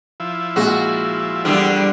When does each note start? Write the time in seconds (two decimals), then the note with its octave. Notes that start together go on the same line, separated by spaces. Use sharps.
0.20 F3 E4
0.56 A#2 G#3 F#4
1.45 E2 D3 G3 D4